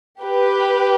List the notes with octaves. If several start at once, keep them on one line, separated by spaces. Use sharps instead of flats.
G4 B4